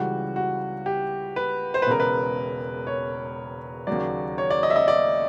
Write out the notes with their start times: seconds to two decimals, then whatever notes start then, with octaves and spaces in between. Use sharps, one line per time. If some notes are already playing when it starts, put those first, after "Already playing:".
Already playing: C#2 C#3 E3 G3 F#4
0.36 F#4
0.86 G4
1.36 B4
1.74 C5
1.82 B4
1.87 E1 E2 C#3 A#4
2.00 B4
2.87 C#5
3.87 D#2 C#3 F#3 D5
4.38 C#5
4.50 D5
4.63 D#5
4.70 E5
4.76 D#5
4.88 D5